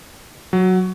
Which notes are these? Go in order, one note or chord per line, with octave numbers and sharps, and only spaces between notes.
F#3